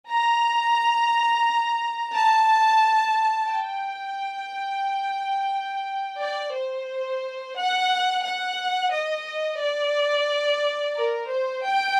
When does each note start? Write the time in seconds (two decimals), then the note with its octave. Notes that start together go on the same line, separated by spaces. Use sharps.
0.10 A#5
2.15 A5
3.50 G5
6.22 D5
6.56 C5
7.59 F#5
8.26 F#5
8.94 D#5
9.62 D5
10.97 A#4
11.31 C5
11.65 G5